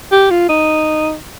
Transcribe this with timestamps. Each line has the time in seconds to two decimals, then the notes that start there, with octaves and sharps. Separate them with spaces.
0.12 G4
0.30 F4
0.49 D#4